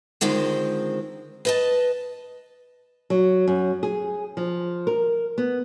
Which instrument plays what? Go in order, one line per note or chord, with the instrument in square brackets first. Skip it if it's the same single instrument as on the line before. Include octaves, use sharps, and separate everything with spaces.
[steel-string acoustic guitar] D3 D#3 F3 G#3 C4
B4 D#5 A5
[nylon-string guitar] F#3
F#2
G#4
F3
A#4
B3